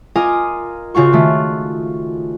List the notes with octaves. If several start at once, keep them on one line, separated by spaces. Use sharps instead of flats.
F4 A#4 D#5 G#5 D6 D#6
C#3 F4 F#4 C#6
D#3 A3